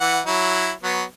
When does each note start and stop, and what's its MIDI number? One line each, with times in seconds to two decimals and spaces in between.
0.01 0.20 52
0.01 0.20 78
0.26 0.71 54
0.26 0.71 64
0.83 1.03 54
0.83 1.03 59